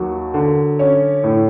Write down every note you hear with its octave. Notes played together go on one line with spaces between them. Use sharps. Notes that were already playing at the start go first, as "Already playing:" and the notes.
Already playing: D#2 F#3
D3
C#4
A2